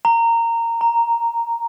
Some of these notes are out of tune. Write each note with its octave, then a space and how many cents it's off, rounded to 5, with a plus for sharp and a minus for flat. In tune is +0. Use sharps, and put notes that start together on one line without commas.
A#5 -15
A#5 +0